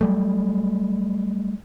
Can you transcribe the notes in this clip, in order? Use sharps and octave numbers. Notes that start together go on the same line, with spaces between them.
F#3 G3 A3